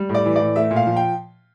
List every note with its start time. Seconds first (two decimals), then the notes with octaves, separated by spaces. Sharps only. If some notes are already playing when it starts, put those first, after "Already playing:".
Already playing: G3
0.09 A2
0.15 D5
0.26 E3
0.36 A2 D5
0.56 A3 E5
0.71 A#2
0.76 F5
0.87 F3
0.96 G5